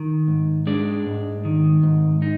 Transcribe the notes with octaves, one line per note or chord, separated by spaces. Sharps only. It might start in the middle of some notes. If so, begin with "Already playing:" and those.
Already playing: D#3
G#2
G#3 D4 D5
G#2
D#3
G#2
D#4